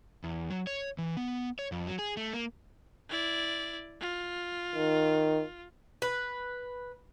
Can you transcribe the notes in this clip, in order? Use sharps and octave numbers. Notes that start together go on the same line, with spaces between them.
E2
F#3
C#5
E3
B3
C#5
F2
F#3
G#4
A3
A#3
E4 D5
F4
D#3
B4